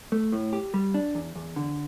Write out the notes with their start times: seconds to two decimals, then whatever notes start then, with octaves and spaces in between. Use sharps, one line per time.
0.12 A3
0.32 A2
0.53 G4
0.74 G3
0.94 D4
1.15 E2
1.36 E2
1.56 D3